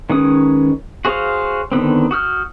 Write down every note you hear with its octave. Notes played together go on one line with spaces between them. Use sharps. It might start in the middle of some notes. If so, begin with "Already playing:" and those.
D#3 G#3 C#4 B4 D#6
F#4 G#4 C5 C#5 F5
D3 D#3 B3 C4
F#4 D#6 F6 G6